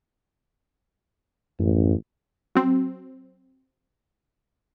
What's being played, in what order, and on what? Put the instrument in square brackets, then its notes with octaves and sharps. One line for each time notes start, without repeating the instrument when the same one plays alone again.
[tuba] A1 [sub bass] F#2
[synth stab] F#3 C4